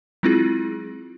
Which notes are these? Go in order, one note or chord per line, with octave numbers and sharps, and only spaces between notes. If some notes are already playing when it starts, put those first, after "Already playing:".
F#3 G#3 C4 E4 F4 G#4